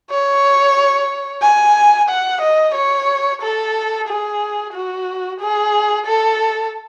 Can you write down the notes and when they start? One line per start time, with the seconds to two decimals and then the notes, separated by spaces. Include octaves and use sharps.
0.11 C#5
1.42 G#5
2.09 F#5
2.41 D#5
2.75 C#5
3.42 A4
4.08 G#4
4.73 F#4
5.39 G#4
6.06 A4